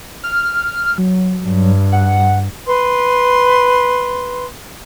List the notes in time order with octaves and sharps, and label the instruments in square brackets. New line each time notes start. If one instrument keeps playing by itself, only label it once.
[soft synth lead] F6
F#3
[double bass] G2
[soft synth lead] F#5
[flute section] B4 C6